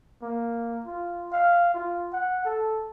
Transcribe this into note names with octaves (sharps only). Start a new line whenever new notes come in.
A#3
F4
F5
F4
F#5
A4